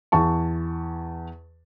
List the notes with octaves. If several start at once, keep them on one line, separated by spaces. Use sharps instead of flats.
E2 A5 C#6